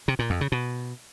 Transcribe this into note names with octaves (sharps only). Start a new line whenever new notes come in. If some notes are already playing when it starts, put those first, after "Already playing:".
C3
A#2
F2
C#3
B2